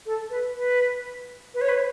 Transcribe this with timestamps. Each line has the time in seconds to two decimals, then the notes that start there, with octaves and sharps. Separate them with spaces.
0.06 A4
0.30 B4
0.55 B4
1.54 B4
1.61 C#5
1.69 B4